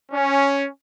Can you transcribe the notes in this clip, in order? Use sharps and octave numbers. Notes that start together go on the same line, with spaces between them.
C#4